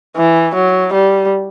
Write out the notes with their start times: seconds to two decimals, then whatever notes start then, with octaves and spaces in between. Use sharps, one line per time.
0.17 E3
0.55 F#3
0.94 G3